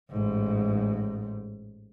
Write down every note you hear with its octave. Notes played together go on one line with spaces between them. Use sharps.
A1 G#2